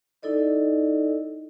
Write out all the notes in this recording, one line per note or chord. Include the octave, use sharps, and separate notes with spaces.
D#4 E4 A4 D5 D#5